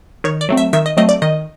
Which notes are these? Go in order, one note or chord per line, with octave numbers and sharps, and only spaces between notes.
D#3 C#5
D5
F#3 A3 C4
E5
D#3 E5
D#5
F#3 A3 C4 D#5
D5
D#3 D#5